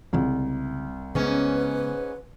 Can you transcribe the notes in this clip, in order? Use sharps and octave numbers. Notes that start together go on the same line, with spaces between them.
C2 C#3 G3 G#3
G#2 C#3 G#3 B3 C#4 B4